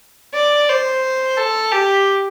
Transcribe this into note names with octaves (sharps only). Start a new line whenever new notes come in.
D5
C5
A4
G4